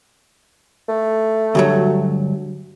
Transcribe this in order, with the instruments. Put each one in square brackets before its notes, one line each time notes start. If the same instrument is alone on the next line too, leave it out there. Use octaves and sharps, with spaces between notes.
[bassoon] A3
[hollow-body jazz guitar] D2 G2 F#3